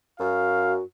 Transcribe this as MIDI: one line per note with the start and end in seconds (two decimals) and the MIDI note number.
0.20 0.79 42
0.20 0.84 66
0.20 0.74 77